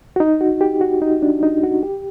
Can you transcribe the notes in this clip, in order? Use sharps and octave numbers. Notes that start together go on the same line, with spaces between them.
F#4
D#4
F#4
G4
F#4
D#4
D4
D#4
F#4
G4